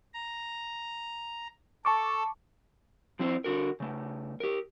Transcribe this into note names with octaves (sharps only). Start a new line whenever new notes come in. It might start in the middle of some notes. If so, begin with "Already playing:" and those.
A#5
A4 A5 C#6 D6
F3 C4 E4 C5
D3 F#4 A#4
C#3 A3
G4 A#4